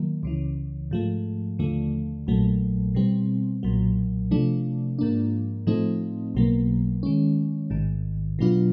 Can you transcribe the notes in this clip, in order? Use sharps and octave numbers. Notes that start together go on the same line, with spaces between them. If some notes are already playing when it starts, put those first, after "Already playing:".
Already playing: D#3 F#3 A#3
C#2 C#3 E3
G#2 F3 A3
D#2 D3 F3 A3
A#1 A#2 F#3 A3
B2 G3 C4
B1 A#2 F#3
C3 F3 A3 D4
G#2 F3 A#3 D4
A2 F3 A3 C4 D#4
B1 B2 F#3 A#3
D#3 G#3 C#4
A1 G#2 D#3
B2 F#3 B3 D4 F4